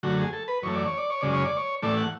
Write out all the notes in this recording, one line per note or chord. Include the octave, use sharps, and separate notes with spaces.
F#2 D3 F#3 A3 F#4
G#4
A4
B4
F#2 E3 A3 C#5
D5
C#5
D5
C#5
F#2 C#3 G#3 D5
C#5
D5
C#5
A2 E3 A3 D5
F#5